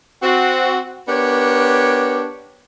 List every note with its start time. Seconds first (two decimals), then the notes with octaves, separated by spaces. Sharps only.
0.22 C4 F#4
1.08 B3 D4 G4 A#4 C#5